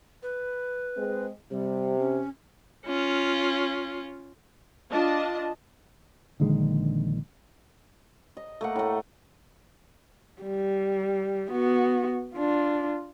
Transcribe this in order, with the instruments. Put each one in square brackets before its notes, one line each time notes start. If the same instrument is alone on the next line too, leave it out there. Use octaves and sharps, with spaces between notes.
[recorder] B4
[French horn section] G#3 C4
[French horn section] C3 [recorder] G3
[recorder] C#4
[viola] C#4 F4
[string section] D4 F4 D#5 A5
[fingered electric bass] A#1 D3 D#3 G#3
[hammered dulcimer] D#5
A3 A#3 F#5
A2 A3
[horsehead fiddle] G3
B3 F#4
D4 F4